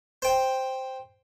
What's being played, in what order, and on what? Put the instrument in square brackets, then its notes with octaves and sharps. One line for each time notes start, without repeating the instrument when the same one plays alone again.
[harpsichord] C5 G5